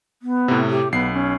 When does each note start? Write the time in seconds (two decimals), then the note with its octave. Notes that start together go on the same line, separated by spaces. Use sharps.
0.22 B3
0.48 A2 C3
0.70 G4
0.92 B1 B3 C7
1.13 C#4